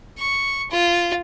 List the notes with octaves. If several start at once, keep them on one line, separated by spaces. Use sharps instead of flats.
C#6
F4